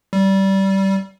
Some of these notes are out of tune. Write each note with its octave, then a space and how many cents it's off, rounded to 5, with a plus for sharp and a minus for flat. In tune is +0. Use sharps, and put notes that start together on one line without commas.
G3 -20